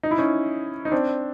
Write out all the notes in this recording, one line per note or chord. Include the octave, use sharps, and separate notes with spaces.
D#4
E4
C#4 D#4
D#4
C4 D4